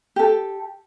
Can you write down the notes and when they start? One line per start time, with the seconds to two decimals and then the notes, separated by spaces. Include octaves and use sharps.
0.16 G4 A4